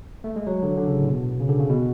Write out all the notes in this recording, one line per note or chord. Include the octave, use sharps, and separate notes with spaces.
A3
G#3
F#3
D3
D3
C#3
A2
B2
C#3
D3
C#3
B2